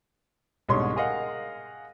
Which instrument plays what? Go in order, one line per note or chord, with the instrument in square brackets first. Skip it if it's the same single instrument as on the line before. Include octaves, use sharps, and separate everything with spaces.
[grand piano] C2 G#2 B2 D3 C#5 C6
G#4 A#4 D#5 F5 F#5